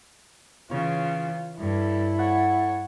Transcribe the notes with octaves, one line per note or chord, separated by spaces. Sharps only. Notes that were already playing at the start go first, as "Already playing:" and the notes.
C#3 E3 F4 C#5
G2 E4 A4
C#5 F#5